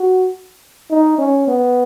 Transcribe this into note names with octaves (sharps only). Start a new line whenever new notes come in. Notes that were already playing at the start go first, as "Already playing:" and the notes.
Already playing: F#4
D#4
C#4
B3